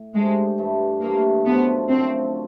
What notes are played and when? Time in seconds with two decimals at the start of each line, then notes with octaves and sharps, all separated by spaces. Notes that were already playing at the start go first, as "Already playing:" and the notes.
Already playing: A2
0.14 G#3 A3 D4 G4 C5
0.58 G2 E3 A3
1.02 G2 E3 A3 A#3
1.46 F#2 D3 F3 A3 B3
1.89 F#2 D3 F3 A3 C4